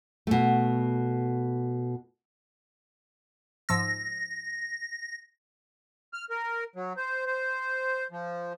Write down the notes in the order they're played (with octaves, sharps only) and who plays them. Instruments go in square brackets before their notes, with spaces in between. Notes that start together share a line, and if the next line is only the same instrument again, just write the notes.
[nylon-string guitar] B2 A3
[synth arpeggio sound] G#2 F3 E6 [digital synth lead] A#6
[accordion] F6
A#4
F#3
C5
C5
F3